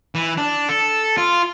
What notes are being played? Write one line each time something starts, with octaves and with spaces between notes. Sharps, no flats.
E3
D4
A4
F4